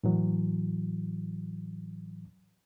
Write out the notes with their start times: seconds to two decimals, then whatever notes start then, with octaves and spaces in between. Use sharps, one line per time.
0.04 A2 E3 F#3